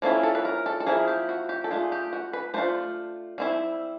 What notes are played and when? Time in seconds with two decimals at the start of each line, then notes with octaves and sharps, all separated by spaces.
0.02 F3 A#3 C#4 E4 A4
0.23 A4
0.35 B4
0.45 A#4
0.66 A4
0.80 A4
0.86 F3 A#3 C#4 E4 G#4
1.08 G4
1.29 F#4
1.49 G4
1.64 A4
1.70 A3 D4 F4 G#4
1.92 G4
2.13 F#4
2.33 B4
2.54 A3 D4 F4 C5
3.38 G3 C4 E4